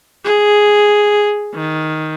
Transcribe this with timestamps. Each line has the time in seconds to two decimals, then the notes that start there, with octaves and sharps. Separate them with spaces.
0.24 G#4
1.54 D#3